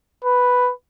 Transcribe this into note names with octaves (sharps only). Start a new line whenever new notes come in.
B4